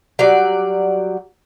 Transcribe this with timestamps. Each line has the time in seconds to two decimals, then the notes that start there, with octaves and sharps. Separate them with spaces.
0.19 F#3 G3 D5